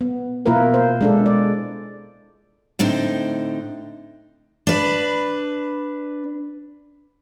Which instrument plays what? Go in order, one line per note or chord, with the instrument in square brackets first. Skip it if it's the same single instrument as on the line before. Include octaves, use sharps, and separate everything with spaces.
[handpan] B3
B2 A#3 E4 F4 A#4 B4
C5
G#3 D4 A4
D5
[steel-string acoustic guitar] A2 D3 C4 D#4
D4 B4